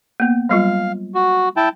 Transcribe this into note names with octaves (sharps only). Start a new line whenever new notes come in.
A#3 B3
F#3 G3 F4 F5
F#4
E4 G5 A5